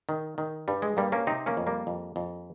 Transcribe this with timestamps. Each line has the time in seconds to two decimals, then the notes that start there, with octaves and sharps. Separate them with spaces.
0.09 D#3
0.38 D#3
0.68 G2 G3
0.82 G#3
0.97 G2 G3 A#3
1.12 A#3 C#4
1.27 C3 C4 D#4
1.46 A#3 C#4
1.57 F2
1.67 G3 A#3
1.87 F2
2.16 F2